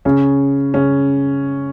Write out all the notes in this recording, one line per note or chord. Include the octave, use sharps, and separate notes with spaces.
C#3 C#4
C#3 C#4